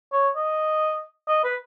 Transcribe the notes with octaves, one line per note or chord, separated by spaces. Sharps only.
C#5
D#5
D#5
B4